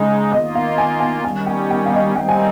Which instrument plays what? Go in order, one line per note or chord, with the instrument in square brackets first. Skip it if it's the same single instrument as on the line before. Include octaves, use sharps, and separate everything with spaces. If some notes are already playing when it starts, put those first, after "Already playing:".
Already playing: [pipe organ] C#3 G#3 D#4
[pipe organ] D#3 A#3 F4 [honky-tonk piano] D#5
[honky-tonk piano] F5
G#5
G#5
[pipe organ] D#3 G3 C#4 [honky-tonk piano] G#5
[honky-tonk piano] G5
G5
F5
D#5
[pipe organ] D#3 G3 C4 D#4 [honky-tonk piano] G5
[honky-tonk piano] G#5